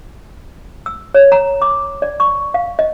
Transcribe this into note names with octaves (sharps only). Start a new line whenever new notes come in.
E6
C#5
A#5
D6
D5
C#6
F5
D#5